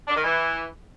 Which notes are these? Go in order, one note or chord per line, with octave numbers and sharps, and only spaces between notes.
D4
D#3
E3